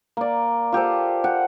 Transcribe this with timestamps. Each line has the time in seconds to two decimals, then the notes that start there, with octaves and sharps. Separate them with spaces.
0.17 A#3 D5
0.72 F4 G4 A4 C5
1.24 F#5 G5